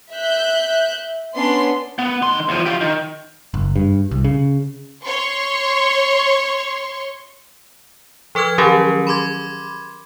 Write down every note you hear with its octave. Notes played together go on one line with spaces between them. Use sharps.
E5 F#6 G6
B3 C#4 D4 C6
B3
D#3 C6
E2 F3
F4 G4
D#3
F#1
G2
C2
C#3
C#5 C6 C#6
F3 A4 B4 F6 G#6
D#3 F#3 C#4 G4 G#4 A#4
B5 C6 D6 G#6